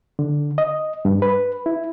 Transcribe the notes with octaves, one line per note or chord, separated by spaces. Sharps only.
D3
D#5
G2
B4
E4